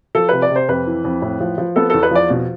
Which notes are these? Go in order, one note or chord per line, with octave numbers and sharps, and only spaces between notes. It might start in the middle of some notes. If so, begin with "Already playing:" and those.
F3 A4
C3 B4
D5
C3
C5
F2 B4
E3
F2
A2
F3
F3
B3 A4
E2 A4
B4
F3 D5
B2